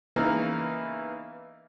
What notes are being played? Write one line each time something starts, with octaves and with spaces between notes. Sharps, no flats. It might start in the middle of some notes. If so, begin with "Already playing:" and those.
C#3 E3 A#3 B3 D#4